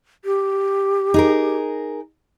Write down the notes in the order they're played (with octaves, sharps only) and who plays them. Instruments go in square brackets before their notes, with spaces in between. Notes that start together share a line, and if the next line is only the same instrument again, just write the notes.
[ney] G4
[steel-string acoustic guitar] D#4 G#4 A#4